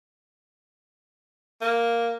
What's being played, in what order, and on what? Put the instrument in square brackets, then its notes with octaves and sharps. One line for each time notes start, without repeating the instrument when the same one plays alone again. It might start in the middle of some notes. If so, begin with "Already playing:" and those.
[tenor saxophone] A#3